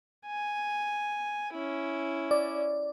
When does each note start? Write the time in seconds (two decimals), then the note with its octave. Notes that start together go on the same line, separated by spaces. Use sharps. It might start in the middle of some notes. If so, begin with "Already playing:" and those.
0.27 G#5
1.53 C#4 E4
2.31 D5